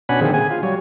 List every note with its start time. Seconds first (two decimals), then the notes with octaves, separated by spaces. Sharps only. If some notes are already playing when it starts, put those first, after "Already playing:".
0.09 B2 C#4 D4 F#5 G#5 B5
0.21 A#2 D3 D#3 F3 C4 G#4
0.34 G#4 G#5
0.51 F4
0.63 F#3 G3 C#5